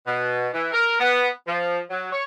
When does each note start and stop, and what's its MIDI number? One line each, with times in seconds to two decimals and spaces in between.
0.06 0.48 47
0.53 0.72 52
0.72 0.97 70
0.99 1.28 59
1.47 1.79 53
1.90 2.10 54
2.12 2.24 73